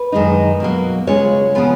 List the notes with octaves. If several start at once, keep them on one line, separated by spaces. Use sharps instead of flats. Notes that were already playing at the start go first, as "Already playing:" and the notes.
Already playing: B4
F#2 D#3 G#3 D#4
B2 F#3 A#3
C#3 G#3 C#4 F4 C#5
C#3 F3 B3 F4